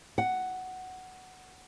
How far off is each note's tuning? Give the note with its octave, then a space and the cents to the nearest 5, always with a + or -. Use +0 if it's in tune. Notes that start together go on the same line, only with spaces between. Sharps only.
F#5 +5